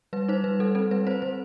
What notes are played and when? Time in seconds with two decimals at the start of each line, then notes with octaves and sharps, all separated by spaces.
0.13 G3 B4
0.28 D#4 C5
0.44 G3 B4
0.59 G3 A4
0.75 C4 A4
0.91 G3 B4
1.07 C4 C5
1.22 G3 C5